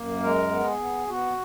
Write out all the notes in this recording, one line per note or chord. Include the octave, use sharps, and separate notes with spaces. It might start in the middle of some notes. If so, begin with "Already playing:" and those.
Already playing: F#2 A#3
G#3 A#4
B3
G#4
B3
B3 F#4